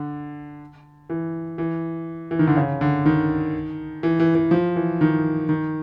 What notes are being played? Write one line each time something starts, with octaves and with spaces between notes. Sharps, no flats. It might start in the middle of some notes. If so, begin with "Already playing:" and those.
Already playing: D3
E3
E3
E3
D#3
D3
C#3
D3
D#3
E3
E3
E3
F3
E3
D#3
D#3